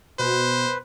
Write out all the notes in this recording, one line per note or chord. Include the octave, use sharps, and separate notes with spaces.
B2 B4 C5